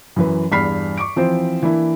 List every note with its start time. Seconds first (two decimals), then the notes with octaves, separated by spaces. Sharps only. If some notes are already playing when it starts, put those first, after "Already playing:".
0.16 F#2 E3 B4
0.51 E2 G2 B5 F6 B6 C7
0.98 C#6 D6 D7
1.16 E3 F3 C4 C5
1.63 E3 A#3 D4 E4